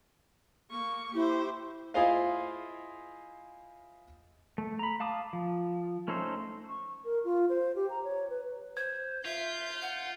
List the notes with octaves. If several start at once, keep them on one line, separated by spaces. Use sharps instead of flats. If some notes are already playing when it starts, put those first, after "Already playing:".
A#3 C#6
E4 G4 C5
E4 F4 G#4 C5 D#5 F5
A3
A#5 B5
F5 A5 D6 D#6
F3
A3 C#4 D#4 A4 C5
C#6
A#4
F4
C5
G4
A#5
C#5
B4
C5 G#6
F4 E5 G6
F#5